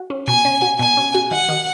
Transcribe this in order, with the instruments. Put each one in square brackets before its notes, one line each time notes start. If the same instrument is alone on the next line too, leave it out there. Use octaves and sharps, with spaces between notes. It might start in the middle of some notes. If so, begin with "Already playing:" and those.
Already playing: [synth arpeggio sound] F#4
C#4
[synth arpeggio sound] B2 [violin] G#5
[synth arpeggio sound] C#4
F#4
[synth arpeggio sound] B2 [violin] G#5
[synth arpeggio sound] C#4
F#4
[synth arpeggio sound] D#3 [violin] F#5
[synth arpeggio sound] D#3